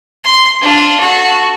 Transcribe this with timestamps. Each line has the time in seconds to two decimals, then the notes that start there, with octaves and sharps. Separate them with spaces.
0.24 C6
0.61 D4 F4
0.99 F#4 A4